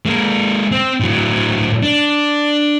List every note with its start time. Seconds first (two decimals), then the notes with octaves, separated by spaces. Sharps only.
0.05 G#3 A#3
0.72 C4
1.00 A2 F#3
1.83 D4